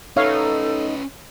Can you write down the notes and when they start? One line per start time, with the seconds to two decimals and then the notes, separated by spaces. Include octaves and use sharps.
0.17 C#4 D#4 A4 B4 C#5 E5 F5